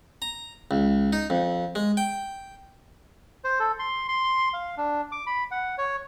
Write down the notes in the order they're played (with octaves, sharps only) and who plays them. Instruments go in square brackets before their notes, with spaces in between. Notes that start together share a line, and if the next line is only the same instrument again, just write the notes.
[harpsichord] A#5
C#2
D#4
F2
G#3
G5
[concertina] C5
A4
C6
C6
F5
D4
D6
B5
F#5
C#5